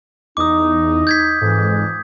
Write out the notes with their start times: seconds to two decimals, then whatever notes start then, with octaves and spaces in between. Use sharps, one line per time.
0.37 E2 D#4 D6 D#6
1.07 G6 G#6 B6
1.41 F2 G#2 E3